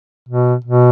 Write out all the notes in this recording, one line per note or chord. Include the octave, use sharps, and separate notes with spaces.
B2
B2